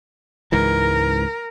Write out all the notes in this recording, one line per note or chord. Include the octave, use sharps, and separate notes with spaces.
C#2 G#2 E3 A#4